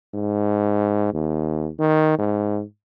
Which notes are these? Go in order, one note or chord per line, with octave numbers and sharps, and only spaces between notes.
G#2
D#2
D#3
G#2